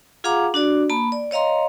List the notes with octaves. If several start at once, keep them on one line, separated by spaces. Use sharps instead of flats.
F4 G#4 F5 F#5 A#5 D6
D4 F#4 D5
A#3 A5 B5
D5
C#5 D#5 F5 A#5 C6